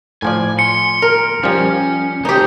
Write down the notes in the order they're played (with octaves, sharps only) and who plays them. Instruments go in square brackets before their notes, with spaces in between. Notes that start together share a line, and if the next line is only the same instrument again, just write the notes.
[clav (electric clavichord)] A2 F3 D5 [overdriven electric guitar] G#5
[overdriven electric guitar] C6 [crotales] C#7
[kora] A#4
[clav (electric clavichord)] F3 G3 [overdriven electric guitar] C#4
[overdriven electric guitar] A2 C5 [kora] D#4 G4